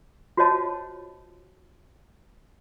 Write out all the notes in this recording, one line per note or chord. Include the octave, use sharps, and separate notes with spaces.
F4 F#4 C5 C#5 D#5 A5